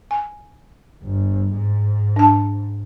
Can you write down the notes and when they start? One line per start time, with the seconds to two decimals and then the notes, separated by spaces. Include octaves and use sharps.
0.11 G#5
1.02 G1
1.54 G#2
2.16 D4 A5